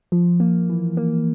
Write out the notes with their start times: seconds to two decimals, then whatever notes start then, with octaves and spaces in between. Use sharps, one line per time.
0.12 F3
0.40 A#3
0.69 E3
0.97 A#3